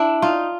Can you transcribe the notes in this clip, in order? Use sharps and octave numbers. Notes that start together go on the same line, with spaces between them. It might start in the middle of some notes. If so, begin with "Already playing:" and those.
Already playing: D4 E4
D#4 F4